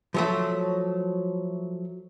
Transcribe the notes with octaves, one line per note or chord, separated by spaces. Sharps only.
F3 F#3 A3